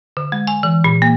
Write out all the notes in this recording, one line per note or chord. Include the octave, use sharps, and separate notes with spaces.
D3
G#3
G#5
E3
A#2
A#3